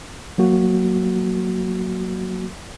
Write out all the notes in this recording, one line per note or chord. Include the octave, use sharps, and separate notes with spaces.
F#3 A#3 F#4